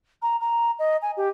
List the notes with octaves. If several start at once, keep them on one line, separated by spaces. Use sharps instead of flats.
A#5
A#5
D#5
G#5
G4